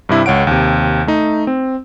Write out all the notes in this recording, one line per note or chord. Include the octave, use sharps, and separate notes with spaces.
G2 C3 E4
C#2 C#5 F#5 D7
D#2 C3
A3 D#4
C4